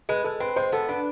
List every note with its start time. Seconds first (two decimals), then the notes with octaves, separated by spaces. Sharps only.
0.09 G#3 B4
0.24 G#3 A4
0.40 C4 B4
0.56 G#3 C5
0.72 B3 A4
0.89 D4 B4